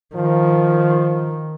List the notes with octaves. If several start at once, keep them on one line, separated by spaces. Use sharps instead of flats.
D#3 F3